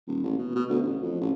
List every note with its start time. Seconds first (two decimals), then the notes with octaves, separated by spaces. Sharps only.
0.07 D#1
0.24 A1
0.39 B2
0.55 B2
0.69 D2
0.82 A1
1.02 F2
1.21 A1